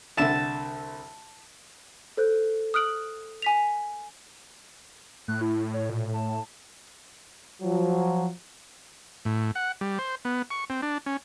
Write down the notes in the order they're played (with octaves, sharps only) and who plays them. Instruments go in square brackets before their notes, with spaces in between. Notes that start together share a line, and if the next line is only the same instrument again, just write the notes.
[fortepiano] C2 D3 E5 [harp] A5 E7
[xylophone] A4 C5 F#6
D#6 F6 F#6 D7 F#7
G#5 B6 F7
[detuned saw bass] A2 [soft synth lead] F#6
[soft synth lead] E4
C#5
A#2
A5
[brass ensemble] F3 F#3
[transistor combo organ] A2
F#5
G3
C5
B3
C#6
C4
D4
C#4